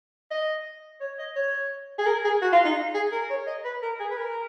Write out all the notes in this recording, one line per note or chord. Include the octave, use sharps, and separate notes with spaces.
D#5
C#5
D#5
C#5
G#4
A#4
G#4
F#4
F4
D#4
G#4
A#4
C#5
D#5
B4
A#4
G#4
B4
A#4